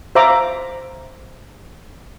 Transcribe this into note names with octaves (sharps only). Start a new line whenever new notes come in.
C5 E5 F5 A#5 D6